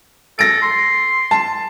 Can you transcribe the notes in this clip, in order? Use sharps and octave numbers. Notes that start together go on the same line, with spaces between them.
A4 A#6 D7
C6
A5